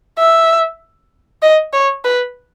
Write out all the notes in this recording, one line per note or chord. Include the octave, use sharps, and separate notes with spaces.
E5
D#5
C#5
B4